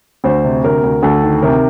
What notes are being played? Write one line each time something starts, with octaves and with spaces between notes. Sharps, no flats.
D2 C5
C3
D2 A#4
D2
D2 A4
D#3
C3 A#4